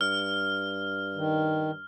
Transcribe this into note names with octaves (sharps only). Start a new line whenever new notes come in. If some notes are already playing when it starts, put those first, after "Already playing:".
G2 F6
D#3